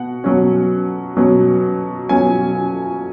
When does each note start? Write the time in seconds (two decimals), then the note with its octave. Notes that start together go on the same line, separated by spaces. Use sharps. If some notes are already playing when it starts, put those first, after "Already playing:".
Already playing: B2 F#5
0.24 B2 F#3 C#4
1.17 B2 F#3 C#4
2.09 B2 F#3 C#4 G#5